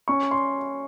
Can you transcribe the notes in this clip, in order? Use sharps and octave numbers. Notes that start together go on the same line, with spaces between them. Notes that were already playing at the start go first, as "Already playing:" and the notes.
C#4 C#6
C6